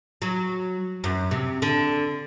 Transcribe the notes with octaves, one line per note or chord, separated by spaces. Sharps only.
F#3
F#2
C3
D3